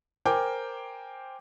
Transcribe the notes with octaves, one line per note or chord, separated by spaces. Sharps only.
A#4 C5 G5 G#5 D6